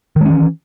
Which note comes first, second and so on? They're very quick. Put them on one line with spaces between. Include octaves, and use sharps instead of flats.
D#3 G#3 C#4 E3